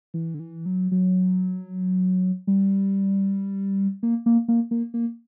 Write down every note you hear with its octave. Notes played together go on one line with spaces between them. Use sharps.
E3
D3
E3
F#3
F#3
G3
A#3
A#3
A#3
A#3
A#3